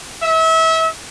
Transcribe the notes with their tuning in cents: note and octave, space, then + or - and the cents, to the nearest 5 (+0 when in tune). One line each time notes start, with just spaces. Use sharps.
E5 -30